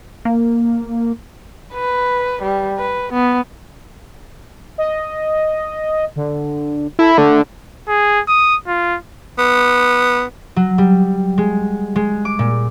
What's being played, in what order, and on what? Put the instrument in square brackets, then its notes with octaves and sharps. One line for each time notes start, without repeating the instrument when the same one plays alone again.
[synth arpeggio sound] A#3
[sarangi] B4
G3
B4
B3
[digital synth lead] D#5
D3
[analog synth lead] E4 [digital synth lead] A4
[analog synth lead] D3 [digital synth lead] A3
[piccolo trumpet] G#4
D#6
F4
[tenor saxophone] B3
[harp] F#3
G3
G#3
G#3
D6
A#2